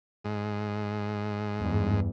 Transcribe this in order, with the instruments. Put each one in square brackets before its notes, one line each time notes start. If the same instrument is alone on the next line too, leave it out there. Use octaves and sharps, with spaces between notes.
[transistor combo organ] G#2
[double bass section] E2 G2